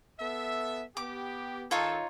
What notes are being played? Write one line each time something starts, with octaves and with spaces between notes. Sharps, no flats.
B3 A4 E5
B3 G4 D6
D#3 D#4 F4 A4 C#5